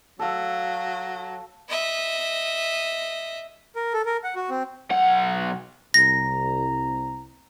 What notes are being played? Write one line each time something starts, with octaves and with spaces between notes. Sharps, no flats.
F#3 A4 F5
D#5 E5
A#4
A4
A#4
F#5
F#4
C4
B1 F#5
C2 A#5 A#6